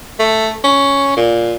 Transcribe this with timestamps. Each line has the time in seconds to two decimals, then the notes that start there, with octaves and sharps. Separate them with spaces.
0.19 A3
0.64 C#4
1.17 A#2